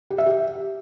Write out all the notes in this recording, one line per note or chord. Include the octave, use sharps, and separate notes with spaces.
G4
E5
G4